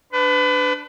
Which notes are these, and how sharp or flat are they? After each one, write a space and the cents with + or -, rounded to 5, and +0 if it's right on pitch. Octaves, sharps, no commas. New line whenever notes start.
D4 +0 B4 +30